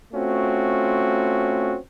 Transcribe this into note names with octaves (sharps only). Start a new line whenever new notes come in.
A3 C4 C#4 F4 F#4